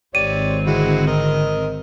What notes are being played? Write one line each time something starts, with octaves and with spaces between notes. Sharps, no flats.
G#1 C4 G4 C#5 D5 D#7
D3 G#3 E4 F#4
A#4 D#5